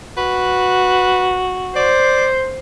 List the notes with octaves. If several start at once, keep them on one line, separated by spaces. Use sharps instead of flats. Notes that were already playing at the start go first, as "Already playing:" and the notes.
F#4 B4
C5 D5